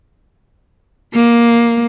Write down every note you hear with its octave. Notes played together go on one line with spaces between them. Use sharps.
A#3